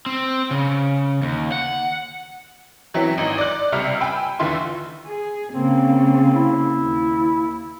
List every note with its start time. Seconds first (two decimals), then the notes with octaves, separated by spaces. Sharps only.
0.06 C4
0.51 C#3
1.22 D#2
1.52 F#5
2.94 E3 F#3 C4 C#4 E4
3.18 G#1 D#4
3.38 D5 F#6
3.72 C#2 C3 G3 E5 F6
4.00 G5 G#5 B5 E6
4.39 D#2 D3 E3 F4 E5 C6
5.06 G#4
5.53 C#3 A#3 C4
6.34 E4
6.81 D#2